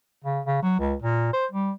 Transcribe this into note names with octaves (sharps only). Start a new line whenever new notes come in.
C#3
C#3
F#3
C#2
A#2
C5
G3